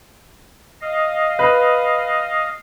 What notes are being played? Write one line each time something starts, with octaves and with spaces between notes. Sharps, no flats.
D#5 F5
B4